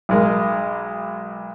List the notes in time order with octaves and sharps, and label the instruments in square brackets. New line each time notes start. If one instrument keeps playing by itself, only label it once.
[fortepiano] B1 G#3 A#4